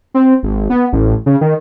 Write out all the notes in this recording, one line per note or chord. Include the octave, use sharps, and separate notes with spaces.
C4
G#1
B3
A1
C#3
D#3